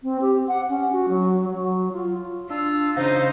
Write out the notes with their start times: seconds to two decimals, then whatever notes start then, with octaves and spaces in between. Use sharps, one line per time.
0.03 C4
0.21 G4
0.48 F#5
0.69 C#4
0.92 F#4
1.09 F#3
1.54 F#3
1.92 F4
2.50 D4 F4 E6
2.97 C#3 D#4 C5 F5